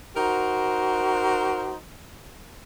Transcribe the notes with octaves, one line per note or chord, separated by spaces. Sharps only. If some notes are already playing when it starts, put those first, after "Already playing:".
D#4 F#4 A#4 C5